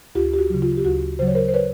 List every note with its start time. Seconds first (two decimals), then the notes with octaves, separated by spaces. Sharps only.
0.15 D2 F4 G4
0.34 G4
0.38 F#4
0.50 C#3 F#3
0.62 F4
0.77 G4
0.85 D2 F#4
1.19 C#3 F#3 C5
1.28 C#5
1.35 A#4 C5
1.48 C5
1.54 B4 C#5